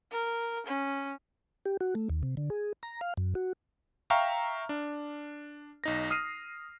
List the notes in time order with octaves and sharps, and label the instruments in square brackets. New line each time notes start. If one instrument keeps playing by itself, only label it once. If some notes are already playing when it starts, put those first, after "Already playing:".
[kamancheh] A#4
C#4
[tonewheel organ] G4
F#4
A3
D#2
C3
D3
G#4
A#5
F5
F#2
F#4
[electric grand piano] E5 F5 G5 A#5 C#6 F6
D4
B1 D#4 A#6
D#6 F6 C7 D#7